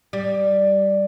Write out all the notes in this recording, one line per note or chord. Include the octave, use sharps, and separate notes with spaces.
G3